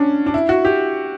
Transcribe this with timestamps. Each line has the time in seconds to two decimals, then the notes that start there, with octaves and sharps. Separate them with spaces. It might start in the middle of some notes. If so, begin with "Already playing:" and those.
Already playing: C#4 D4
0.26 D4
0.34 E4
0.49 F#4
0.65 G4